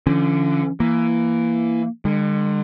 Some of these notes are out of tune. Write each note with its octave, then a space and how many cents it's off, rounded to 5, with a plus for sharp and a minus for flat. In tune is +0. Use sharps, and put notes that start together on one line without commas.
D3 +0 F3 -45 C#4 +0
E3 +15 A#3 +0
D3 +35 G#3 -40